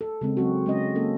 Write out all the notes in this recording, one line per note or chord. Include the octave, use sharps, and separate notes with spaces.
A4
C#3 G#3 C4
F#3 C4 F#4
G#3 C#4 D#5
A#3 C#4 A4